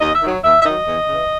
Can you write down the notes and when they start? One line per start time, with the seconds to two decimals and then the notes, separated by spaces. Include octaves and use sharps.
0.01 D#2 D#5
0.15 E5
0.22 D#3 F#3
0.44 D#2 E5
0.62 E5
0.65 D#3 F#3 D#5
0.88 E2
1.09 C#3 E3